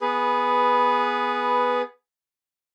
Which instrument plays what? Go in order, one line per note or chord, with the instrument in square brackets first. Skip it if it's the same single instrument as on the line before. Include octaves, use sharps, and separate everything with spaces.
[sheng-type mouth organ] B3 G#4 B4